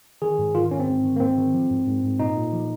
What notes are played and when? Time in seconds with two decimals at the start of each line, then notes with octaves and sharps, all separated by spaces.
0.22 D#3 G#4
0.39 G#2
0.55 D#3 F4
0.71 G#2 C#4
0.80 C4
0.88 G#2
1.04 D#3
1.16 A#3
1.20 G#2 C4
1.37 D#3
1.54 F3
1.70 G#2
1.87 G#2
2.03 G#2
2.19 A#2 D#4
2.36 A#2
2.53 F3